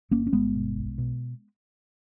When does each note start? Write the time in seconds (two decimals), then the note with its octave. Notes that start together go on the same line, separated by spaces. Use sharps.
0.11 G1 A#3 C#4
0.27 C#4
0.33 G1 G#3 B3
0.55 B2
0.76 B1
0.98 B2